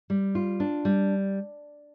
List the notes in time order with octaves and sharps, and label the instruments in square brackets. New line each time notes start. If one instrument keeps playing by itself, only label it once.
[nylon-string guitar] G3
F4
D4
G3